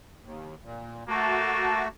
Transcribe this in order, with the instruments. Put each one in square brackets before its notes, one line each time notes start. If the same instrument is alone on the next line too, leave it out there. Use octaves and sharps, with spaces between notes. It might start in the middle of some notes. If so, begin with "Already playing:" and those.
[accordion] D#2
A#2
[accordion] A3 F#4 [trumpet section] A#3 A5